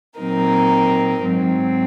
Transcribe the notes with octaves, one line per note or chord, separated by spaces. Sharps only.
A#2 F#3 C4 D#4 A#4
G#2 F#3 C4